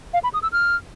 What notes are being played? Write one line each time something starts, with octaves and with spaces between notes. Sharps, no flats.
F5
B5
D#6
E6
F6